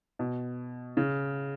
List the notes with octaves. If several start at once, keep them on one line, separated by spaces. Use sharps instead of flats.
B2
C#3